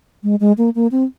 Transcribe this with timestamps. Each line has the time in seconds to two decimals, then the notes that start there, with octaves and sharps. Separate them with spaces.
0.23 G#3
0.40 G#3
0.58 A#3
0.75 A#3
0.92 C4